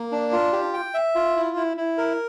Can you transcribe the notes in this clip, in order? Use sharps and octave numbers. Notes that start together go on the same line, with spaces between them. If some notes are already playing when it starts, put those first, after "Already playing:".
Already playing: A#3
D4
F4
G4
G5
E5
F4
E4
E4
E4
A#4